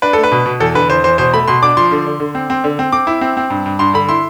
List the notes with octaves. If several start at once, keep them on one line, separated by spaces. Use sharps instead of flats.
D4 B4
A3 A4
B4
B2
B2
E2 A4
D3 B4
E2 C5
E2 C5
B2 C5
A3 B5
B2 C6
D4 D6
F3 C6
D3
D3
D3
C4
C4
D3
C4
C4 D6
E4
C4
C4
G2
G2
G2 C6
D3 B5
E4 C6